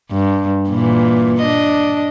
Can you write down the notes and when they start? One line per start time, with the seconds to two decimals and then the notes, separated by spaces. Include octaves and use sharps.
0.11 G2
0.69 A#2 E3
1.41 D4 D#5